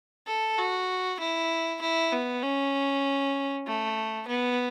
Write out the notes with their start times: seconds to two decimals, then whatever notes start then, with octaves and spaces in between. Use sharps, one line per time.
0.27 A4
0.58 F#4
1.20 E4
1.82 E4
2.12 B3
2.43 C#4
3.66 A3
4.28 B3